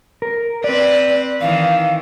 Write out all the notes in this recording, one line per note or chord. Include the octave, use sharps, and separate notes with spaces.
A#4
C4 B4 D5
D#3 E3 F5